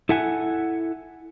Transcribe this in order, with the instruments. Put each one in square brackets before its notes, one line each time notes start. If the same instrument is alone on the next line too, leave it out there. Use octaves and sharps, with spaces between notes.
[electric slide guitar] E4 A4 E5 F#5 G#5